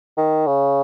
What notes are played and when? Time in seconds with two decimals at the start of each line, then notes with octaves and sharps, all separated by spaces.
0.17 D#3
0.47 C#3